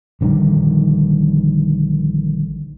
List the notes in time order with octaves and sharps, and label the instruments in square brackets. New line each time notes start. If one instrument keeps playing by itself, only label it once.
[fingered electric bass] A#1 D3 D#3 G3